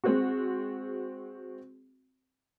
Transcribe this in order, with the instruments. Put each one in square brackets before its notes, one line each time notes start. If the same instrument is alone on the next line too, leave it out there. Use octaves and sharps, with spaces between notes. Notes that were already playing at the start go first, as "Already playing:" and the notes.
[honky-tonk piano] G#3 C4 F#4